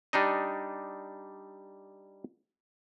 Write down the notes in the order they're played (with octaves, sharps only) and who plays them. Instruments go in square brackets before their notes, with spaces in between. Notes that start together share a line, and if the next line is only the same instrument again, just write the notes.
[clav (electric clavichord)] G3 D4 D#4 D#5